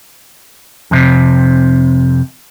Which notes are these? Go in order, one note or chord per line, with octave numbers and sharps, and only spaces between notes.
F2 C3